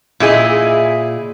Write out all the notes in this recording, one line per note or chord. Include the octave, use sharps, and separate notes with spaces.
A#2 E4 G#4 D#5